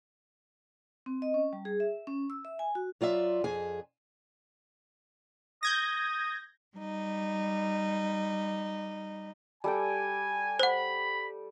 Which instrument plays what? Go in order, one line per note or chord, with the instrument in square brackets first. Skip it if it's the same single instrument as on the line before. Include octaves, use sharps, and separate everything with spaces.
[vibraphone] C4
D#5
C#4
G3
G#4
E5
C#4
E6
E5
G#5
F#4
[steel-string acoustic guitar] F#3 F4 D5 E5
F2 G#4 G#5
[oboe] D#6 [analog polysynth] G6 G#6 A#6
[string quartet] G3 D#4
[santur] G3 A4 G5 [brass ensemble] G#5
[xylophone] C5 F#5 [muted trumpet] B5